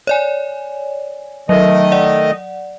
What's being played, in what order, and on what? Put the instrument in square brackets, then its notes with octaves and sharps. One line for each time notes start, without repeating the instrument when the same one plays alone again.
[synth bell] C#5 D5 G#5
[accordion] D#3 A3 D#5 [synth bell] F#3
[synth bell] D5 F#5